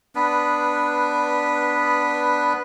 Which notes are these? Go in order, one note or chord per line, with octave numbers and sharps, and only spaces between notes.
B3 D4 B4